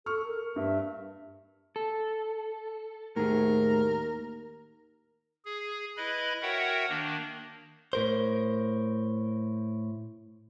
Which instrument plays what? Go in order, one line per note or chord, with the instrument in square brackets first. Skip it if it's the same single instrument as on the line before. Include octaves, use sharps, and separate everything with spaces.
[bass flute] A4 [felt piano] C#6 F6
[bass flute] A#4
[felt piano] G2 [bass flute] E5
[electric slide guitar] A4
[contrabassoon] D#2 [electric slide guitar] A2 G#4 [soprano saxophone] A#4
[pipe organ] G#4
E4 B4 D#5 B5
F#4 A#4 C#5 E5 F#5 G5
D#3 A#3 D4
[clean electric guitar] A2 A#4 C5